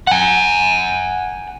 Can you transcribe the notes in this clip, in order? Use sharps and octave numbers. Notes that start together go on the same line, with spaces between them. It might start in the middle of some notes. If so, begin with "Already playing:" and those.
F#5 G#5